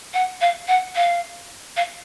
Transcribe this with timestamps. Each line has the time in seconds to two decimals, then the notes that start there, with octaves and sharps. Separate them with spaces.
0.14 F#5
0.41 F5
0.68 F#5
0.96 F5
1.77 F5